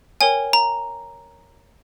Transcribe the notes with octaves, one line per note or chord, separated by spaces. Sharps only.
A#4 C#5 G5 G#5
A#5